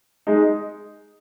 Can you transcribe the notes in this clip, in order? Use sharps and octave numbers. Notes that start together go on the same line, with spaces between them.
G#3 D#4